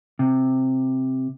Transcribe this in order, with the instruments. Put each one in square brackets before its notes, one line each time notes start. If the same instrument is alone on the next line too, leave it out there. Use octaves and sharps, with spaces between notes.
[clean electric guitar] C3